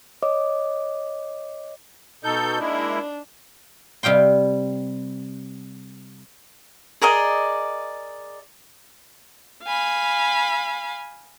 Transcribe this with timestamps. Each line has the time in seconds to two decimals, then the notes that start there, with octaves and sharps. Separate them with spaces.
0.23 C#5 D#5 D6
2.24 B2 D#4 A4 G6
2.59 G#3 A#3 D4 E4
4.03 C3 G3 F5 G5 C6
7.02 G#4 A#4 D5 D#5
9.64 F5 G#5 B5